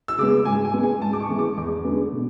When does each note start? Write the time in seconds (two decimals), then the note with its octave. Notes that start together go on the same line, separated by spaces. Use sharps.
0.08 E6
0.18 C#3 G#3 B3 D6
0.45 G#2 G#5
0.65 G#5
0.73 G#3 B3
0.83 G#5
1.02 G#2 A5
1.13 D6
1.20 C#6
1.29 E3 G#3 B3
1.38 D6
1.57 E2 D6
1.85 D3 G#3 B3
2.13 B2